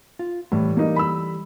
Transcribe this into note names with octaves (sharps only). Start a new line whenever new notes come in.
F4
A2 E3 G3 A3
A#3 D#4
B5 E6